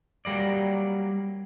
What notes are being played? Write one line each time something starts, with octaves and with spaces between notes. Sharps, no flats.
F#3 G3 A#3 D5